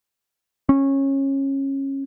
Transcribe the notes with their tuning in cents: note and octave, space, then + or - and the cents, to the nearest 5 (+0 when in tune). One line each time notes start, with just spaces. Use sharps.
C#4 -20